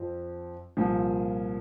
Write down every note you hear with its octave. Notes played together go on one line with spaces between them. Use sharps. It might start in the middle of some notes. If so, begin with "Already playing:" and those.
Already playing: F2 F3 C4
C2 A#2 F3 A#3